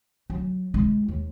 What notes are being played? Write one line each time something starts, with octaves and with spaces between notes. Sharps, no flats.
F#3
G#3 E4
D#2